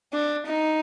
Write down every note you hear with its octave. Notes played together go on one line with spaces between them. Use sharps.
D4
D#4